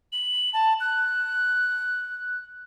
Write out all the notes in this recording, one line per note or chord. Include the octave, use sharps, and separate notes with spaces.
F#7
A5
F#6